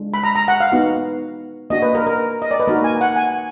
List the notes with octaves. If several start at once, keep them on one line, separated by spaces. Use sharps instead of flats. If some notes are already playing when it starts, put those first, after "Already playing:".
Already playing: G#3 D4 F4
B5
A#5
A#5
F#5
F5
B3 D#4 F#4
A#3 D4 F#4 D#5
B4
A#4
A#4
D#5
D5
B4
A#3 D#4 F#4 A#4
G#5
F#5
G#5